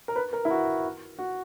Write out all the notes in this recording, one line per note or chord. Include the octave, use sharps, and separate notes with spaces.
A#4
B4
A#4
E4
F#4
F#4